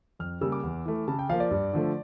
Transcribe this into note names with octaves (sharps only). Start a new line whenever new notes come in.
F2 F6
C#3 G3 A#3 E6
D6
E2
E3 A3
C#3 A5
G5
F3 A#3 F5
D5
G2
D3 F3 A3